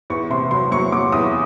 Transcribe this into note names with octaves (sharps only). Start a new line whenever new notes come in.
E2 C#6
C3 C6
F#3 C6
F#3 C#6
F#3 D6
E2 D#6